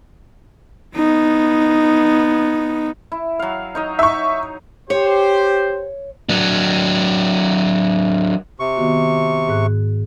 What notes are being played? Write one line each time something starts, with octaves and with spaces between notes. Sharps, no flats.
B3 D#4
E4
F#3 F5
D#4 C#5 D#5
D#4 E5 C#6
G4 C5 C#5
F#3 D4
C3 C#6
D#3 B3 F#4
G#2 F#6